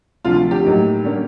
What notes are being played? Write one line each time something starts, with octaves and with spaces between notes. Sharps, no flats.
D2 C3 F3 F4
G4
A2 F#3 A#3 D#4
D3 G3 A#3 C#4